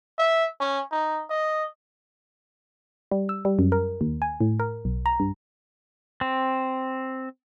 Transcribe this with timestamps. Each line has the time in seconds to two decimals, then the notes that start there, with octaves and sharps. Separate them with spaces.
0.18 E5
0.60 C#4
0.91 D#4
1.30 D#5
3.11 G3
3.29 E6
3.45 G3
3.59 F#2
3.72 A#4
4.01 D#2
4.22 G#5
4.41 A2
4.60 A#4
4.85 B1
5.06 A#5
5.20 G2
6.21 C4